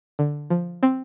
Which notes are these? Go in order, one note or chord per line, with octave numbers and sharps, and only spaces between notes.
D3
F3
C4